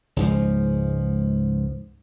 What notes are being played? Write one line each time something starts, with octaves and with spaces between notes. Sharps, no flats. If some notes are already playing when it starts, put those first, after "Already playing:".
C#2 G#2 F3